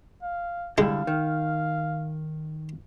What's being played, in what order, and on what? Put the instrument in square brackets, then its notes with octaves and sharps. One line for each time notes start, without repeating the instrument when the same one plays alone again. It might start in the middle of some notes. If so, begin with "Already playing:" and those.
[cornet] F5
[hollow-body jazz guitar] D3 G3 E4 [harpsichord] G#3 [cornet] F5
[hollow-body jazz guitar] D#3